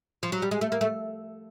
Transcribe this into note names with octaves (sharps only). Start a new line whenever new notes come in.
F3
F#3
G3
G#3
A3
A#3
A3